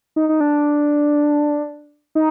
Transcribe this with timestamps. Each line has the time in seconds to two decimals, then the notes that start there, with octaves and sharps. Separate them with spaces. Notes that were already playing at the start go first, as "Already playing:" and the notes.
0.16 D#4
0.29 D#4
0.40 D4
2.15 D#4